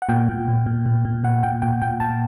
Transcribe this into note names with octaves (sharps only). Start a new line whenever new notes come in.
F#5
A#2 G5
A#2
A#2
A#2
A#2
A#2
A#2 F#5
A#2 G5
A#2 G5
A#2 G5
A#2 A5